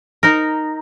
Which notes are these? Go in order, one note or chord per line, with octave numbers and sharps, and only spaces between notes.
D#4 A#4